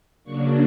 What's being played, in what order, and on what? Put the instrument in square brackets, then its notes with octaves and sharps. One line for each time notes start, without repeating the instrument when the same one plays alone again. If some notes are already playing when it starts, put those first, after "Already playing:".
[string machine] C#3 F#3 A#3 D4 C#6